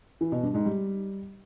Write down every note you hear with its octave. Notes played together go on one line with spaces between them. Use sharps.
E3
B2
G2
G#2
G3